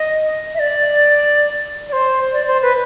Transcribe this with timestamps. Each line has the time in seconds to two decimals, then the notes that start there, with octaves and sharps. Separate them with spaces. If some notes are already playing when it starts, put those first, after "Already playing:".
Already playing: D#5
0.54 E5
0.59 D5
1.89 D5
1.93 C5
2.33 D5
2.47 C5
2.62 B4